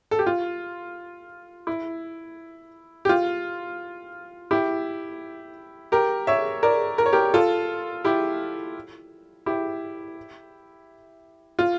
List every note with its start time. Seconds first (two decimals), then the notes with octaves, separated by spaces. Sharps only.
0.11 A4
0.19 G4
0.27 F4
1.67 E4
3.05 G4
3.09 F4
4.51 E4 G4
5.92 G4 A#4
6.27 C#5 E5
6.63 A#4 D5
6.98 A#4
7.06 C#5
7.13 G4 A#4
7.34 F4 A4
8.04 E4 G4
9.46 E4 G4
11.59 F4